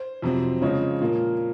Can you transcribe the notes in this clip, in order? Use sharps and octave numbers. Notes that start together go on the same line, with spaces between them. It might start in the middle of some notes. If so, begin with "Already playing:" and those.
Already playing: C5
F2 C3 F#3 C4
C#3 F3 G#3 C4 C#5
A#2 F3 A#3